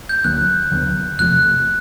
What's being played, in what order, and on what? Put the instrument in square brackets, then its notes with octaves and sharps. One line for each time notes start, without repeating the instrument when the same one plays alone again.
[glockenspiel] G6
[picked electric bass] D2 D3 F#3 A#3 [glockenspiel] F#6
[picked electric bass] D#2 D3 F#3 B3
[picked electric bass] E2 C3 F3 A3 [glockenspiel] F#6